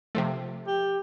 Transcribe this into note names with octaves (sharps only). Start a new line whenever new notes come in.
C3 F3 A3
G4